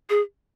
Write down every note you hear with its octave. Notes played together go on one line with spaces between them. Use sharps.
G#4